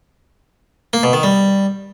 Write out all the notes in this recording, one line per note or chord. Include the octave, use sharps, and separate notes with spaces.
A#3
B2
D#3
G3